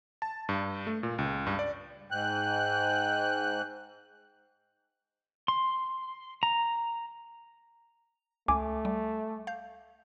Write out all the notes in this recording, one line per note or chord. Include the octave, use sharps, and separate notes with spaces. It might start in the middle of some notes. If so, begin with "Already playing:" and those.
A5
G2
A3
A#2
C#2
G2
D5
G#2 G5 F#6
C6
A#5
C#2 A3 G#5 D6
G3
F5 G6